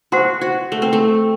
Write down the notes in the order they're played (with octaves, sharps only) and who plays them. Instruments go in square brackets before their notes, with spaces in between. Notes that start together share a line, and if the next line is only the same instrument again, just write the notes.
[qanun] F#4 [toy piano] C5 F#5 C6
[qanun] F#4
A3
C4
A3